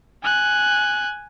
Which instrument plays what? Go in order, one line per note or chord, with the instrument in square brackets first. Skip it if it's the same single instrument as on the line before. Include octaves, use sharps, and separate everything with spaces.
[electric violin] G#5 F#6